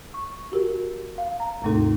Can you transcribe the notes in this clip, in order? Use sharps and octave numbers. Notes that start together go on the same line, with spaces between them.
C#6
F#4 G4 A#4
F5
A#5
D#2 G#2 C3 A3 D#4 A4